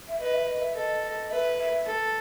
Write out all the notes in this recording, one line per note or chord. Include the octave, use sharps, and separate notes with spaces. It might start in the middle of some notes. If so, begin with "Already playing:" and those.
E5
B4 D#5
E5
D#5
E5
A4 D#5
D#5
B4 E5
E5
A4